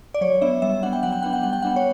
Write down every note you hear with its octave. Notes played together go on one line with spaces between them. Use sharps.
D5
F#3 C#5
B3 D4 E5
G3 E5
B3 D4 F#5
G5
F#3 F#5
G5
B3 D4 F#5
G5
G3 F#5
G5
B3 D4 F#5
C#5